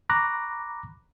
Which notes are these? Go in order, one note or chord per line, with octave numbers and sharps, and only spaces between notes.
A#5 B5 C#6 D6 F#6 A#6